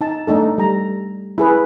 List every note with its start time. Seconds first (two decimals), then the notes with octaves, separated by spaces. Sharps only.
0.01 D#4 A5
0.27 A3 D4 D#4 A4
0.58 G3 A#5
1.38 E4 G#4 B4